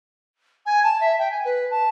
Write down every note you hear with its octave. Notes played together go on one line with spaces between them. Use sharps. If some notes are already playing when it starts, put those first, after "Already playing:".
G#5
A5
E5
G5
G#5
B4
A5